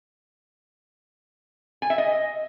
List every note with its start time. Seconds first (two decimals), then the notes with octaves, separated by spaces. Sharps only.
1.82 G#5
1.90 E5
1.98 D#5